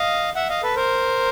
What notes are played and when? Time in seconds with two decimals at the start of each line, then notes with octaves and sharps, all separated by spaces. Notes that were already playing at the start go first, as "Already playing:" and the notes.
Already playing: D#5 F5
0.35 E5 F#5
0.49 D#5 F5
0.63 A4 B4
0.75 A#4 C5